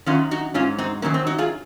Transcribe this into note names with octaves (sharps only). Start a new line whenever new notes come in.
F#2 D#3 F#3 C#4 F4
D#4 F#4
G#2 F#3 C#4 F4
C4 D#4
F#2 D#3 F#3 A#3 C#4
C4
D#4 F#4
F4 G#4